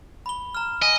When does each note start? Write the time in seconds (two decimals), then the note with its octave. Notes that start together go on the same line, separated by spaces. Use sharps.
0.26 B5 G7
0.55 A#5 F6
0.82 D#5 G#5